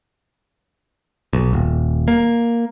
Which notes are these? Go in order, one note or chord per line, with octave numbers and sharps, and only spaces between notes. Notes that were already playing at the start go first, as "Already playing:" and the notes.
B1
D#1
A#3